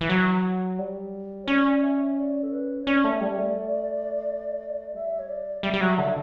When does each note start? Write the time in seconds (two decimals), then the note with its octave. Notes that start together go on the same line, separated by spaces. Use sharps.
0.01 E3
0.09 F#3
0.78 G3
1.44 C#5
1.48 C#4 D5
1.83 E5
2.17 D5
2.43 A4
2.52 B4
2.82 C#5
2.87 C#4 D5
3.04 A3
3.21 G3 D5
3.38 A3
4.94 G3 E5
5.19 C#5
5.29 D5
5.63 G3 E5
5.74 G3
5.81 F#3
5.98 D3